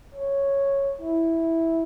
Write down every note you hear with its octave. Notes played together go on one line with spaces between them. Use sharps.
C#5
E4